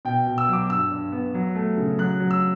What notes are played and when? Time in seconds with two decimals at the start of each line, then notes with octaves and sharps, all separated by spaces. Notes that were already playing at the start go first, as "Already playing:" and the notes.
0.05 B2 G5
0.27 B2
0.38 E6
0.48 F#3 D6
0.70 G2 E6
0.91 G2
1.12 B3
1.34 F#3
1.55 A3
1.78 C#3
1.98 F#3 F#6
2.20 F#3
2.31 E6